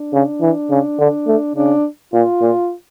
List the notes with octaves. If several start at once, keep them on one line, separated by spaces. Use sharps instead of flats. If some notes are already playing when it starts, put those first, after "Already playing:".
Already playing: D4
C#3
E3
C#3
D3
A3
C#3 D4
A#2 F4
A#2